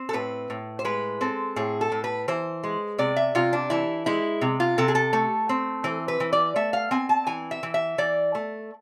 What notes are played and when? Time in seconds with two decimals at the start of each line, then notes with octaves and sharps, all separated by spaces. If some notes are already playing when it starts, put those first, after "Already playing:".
Already playing: C4
0.09 A4
0.13 A2 B4
0.50 A2
0.79 C5
0.85 G#3 B4
1.21 C4 A4
1.56 A2 G#4
1.81 A4
1.92 A2
2.04 B4
2.28 E3 C5
2.64 G#3
2.98 C3 D5
3.16 E5
3.35 C3 F4
3.53 D4
3.70 E3 E4
4.06 G#3 E4
4.41 C3
4.60 F4
4.78 C3 A4
4.88 G#4
4.95 A4
5.13 A3
5.49 C4
5.84 E3 C5
6.08 B4
6.20 E3
6.33 D5
6.56 A3 E5
6.73 F5
6.91 C4 G#5
7.09 A5
7.27 E3 G#5
7.51 E5
7.63 E3
7.74 E5
7.98 E3 D5
8.35 A3